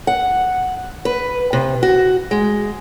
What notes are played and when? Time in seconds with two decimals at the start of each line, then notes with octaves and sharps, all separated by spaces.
0.07 F#5
1.05 B4
1.53 C3
1.83 F#4
2.31 G#3